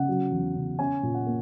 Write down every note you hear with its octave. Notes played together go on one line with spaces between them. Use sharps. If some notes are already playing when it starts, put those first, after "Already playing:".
Already playing: C#3 F#5
F#3
E2
C#3
C#4 G#5
A#2
F#5
A#3